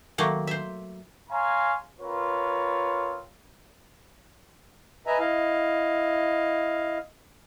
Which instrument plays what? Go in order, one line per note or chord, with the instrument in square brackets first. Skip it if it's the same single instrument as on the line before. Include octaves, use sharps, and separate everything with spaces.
[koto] D#3 F#3 A3 A#3
C5 E5
[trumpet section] C#5 F5 G#5 A#5 C6
C4 F4 A#4 B4 C#5
[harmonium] B4 D#5 E5 G#5 A#5
E4 D#5 F5